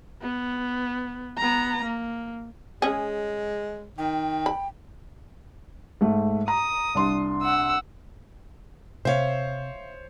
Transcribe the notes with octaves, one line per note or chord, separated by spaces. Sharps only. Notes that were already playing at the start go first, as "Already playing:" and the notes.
B3
B3 A#5
A#3
G#3 C#4 G#4
D#3 G5
B5
G#2 A3
A#5 D#6
C2 D4 C6
F#5 E6
C3 C5 C#5 E5 F5